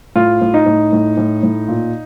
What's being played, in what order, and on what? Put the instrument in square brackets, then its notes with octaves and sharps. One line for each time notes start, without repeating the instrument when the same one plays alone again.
[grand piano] A2 F4
A2
D#4
A2
A2
A2
A2
A#2